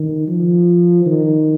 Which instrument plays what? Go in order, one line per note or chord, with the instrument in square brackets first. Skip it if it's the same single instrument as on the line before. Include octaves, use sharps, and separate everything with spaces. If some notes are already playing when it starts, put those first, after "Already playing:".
Already playing: [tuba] D#3
F3
D#3